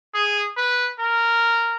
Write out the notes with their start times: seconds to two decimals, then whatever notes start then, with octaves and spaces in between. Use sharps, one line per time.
0.14 G#4
0.57 B4
1.00 A#4